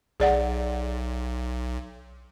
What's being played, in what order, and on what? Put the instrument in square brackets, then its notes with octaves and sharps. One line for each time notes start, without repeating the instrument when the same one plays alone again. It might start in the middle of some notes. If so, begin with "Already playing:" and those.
[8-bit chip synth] B1 [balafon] G#4 D5 F#5